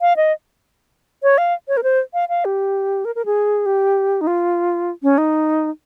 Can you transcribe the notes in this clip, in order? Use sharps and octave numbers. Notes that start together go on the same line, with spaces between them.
F5
D#5
C#5
F5
C#5
A#4
C5
F5
F5
G4
A#4
A#4
G#4
G4
D#4
F4
C#4
D#4